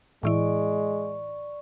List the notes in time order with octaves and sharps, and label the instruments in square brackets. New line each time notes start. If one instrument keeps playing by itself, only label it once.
[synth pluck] A2 E3 E4 [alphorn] G#3 [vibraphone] D5 C#6